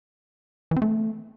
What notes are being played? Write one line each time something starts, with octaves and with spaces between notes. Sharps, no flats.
E3
C4
A3